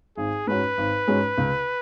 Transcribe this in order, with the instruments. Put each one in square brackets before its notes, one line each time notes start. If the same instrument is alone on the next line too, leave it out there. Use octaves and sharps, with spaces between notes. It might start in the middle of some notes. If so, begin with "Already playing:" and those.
[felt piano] G#1 [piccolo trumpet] G#4
[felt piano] G#2 G#3 C#4 F#4 [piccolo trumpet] B4
[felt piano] G#1
G#2 G#3 C#4 F#4
C#2